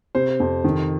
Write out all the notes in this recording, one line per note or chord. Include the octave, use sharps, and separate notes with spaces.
C3 C5
F2
D#3